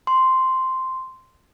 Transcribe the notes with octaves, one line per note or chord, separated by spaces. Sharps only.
C6